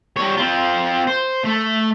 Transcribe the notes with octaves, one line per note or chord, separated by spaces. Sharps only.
G3 C#5
C4 F4
C5
A3